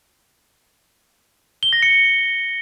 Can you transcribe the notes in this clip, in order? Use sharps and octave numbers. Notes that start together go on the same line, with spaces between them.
G7
A#6
C#7